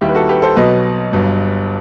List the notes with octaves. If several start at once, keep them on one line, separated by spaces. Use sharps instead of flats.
D#2 D#3 G3 E4 G4
B4
F#4 A4
G4 B4
A4 C5
B1 B2 F#3 B4 D#5
G1 G2 F#3